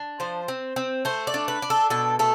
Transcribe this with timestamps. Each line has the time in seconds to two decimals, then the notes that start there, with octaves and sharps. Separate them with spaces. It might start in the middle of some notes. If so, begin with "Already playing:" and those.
Already playing: D4
0.20 F3 C5
0.48 C4
0.76 C4
1.05 A3 C5
1.27 D5
1.34 D4
1.48 B4
1.62 D4
1.70 A4
1.90 B2 A4
2.19 A3 A4